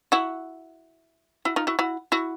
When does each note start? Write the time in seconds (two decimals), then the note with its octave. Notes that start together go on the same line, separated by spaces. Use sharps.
0.12 E4 F#4
1.45 E4 F#4
1.56 D#4 F4
1.67 E4 F#4
1.79 E4 F#4
2.12 E4 F#4